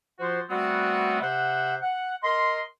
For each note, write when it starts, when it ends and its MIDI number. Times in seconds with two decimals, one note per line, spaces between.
0.20 0.40 53
0.20 0.40 65
0.20 0.40 66
0.20 0.40 72
0.50 1.21 55
0.50 1.21 57
0.50 1.21 59
0.50 1.21 60
0.50 1.21 66
1.21 1.75 48
1.21 1.75 72
1.21 1.75 76
1.21 1.75 78
1.82 2.15 78
2.23 2.61 70
2.23 2.61 75
2.23 2.61 84